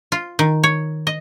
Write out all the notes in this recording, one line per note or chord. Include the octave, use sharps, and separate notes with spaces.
F4
D#3
C#5
D#5